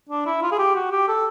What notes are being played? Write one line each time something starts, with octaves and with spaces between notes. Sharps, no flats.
D4
E4
F4
G#4
G4
F#4
G4
A4